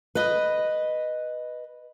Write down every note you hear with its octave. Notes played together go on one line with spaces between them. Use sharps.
B4 D#5